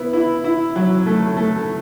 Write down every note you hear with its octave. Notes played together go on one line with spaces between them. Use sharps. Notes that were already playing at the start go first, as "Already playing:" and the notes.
Already playing: B3 E4
E4
E4
F#3
A3
A3